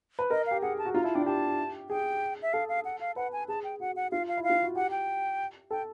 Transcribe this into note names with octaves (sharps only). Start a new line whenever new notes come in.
B4
A#4 D#5
G4 F5
G#4 F#5
A5
F#4
F4 A#5
E4 A5
D4 G5
G4 A5
G#4 G5
E5
A4 F5
F5
F#5
F5
B4 F#5
G#5
G#4 A5
G5
F#4 F#5
F#5
F4 F5
F5
E4
F5
F4
F#4
G4 F#5
G5
A4 G5